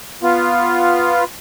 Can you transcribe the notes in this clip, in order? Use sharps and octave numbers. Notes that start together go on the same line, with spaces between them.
B3 F4